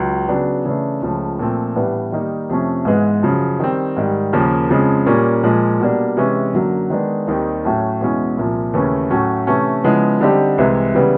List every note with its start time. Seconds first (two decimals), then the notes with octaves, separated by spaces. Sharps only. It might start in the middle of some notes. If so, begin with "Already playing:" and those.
Already playing: C#2 F#3
0.28 C#3 F#3 B3 D4
0.65 C#3 E3 A3 D4
1.02 C#2 C#3 F3 A3
1.39 A#2 F3 A3 C4
1.76 A2 E3 G3 B3 D4
2.12 D#3 G3 A#3 D#4
2.49 F2 C3 F3 A3 C#4
2.85 G#2 E3 G#3 B3
3.23 F#2 C#3 F3
3.60 D#3 G3 C4
3.97 G#2 D#3 G3
4.33 D#2 C#3 F3 A#3
4.69 F2 C#3 F3 G#3
5.06 A#2 G3 A#3 C#4
5.43 A#2 F3 G#3
5.80 B2 G3 A#3 D4
6.17 C3 E3 G#3 C#4
6.53 F#2 D3 F#3 A#3
6.90 D#3 G#3 B3 D4
7.27 D#2 D#3 G3 C4 D#4
7.64 A2 F#3 A3 C#4 E4
8.01 E2 B2 G#3 C#4 E4
8.37 C2 A#2 F3
8.73 D#2 C#3 E3 A3 C#4
9.10 A2 F#3 A3 C#4 F#4
9.47 C3 E3 A3 C#4
9.84 C#3 F3 G#3 B3 E4
10.21 D3 G3 C4 D#4 G4
10.58 C2 C3 E3 G#3
10.95 C#3 E3 G3 B3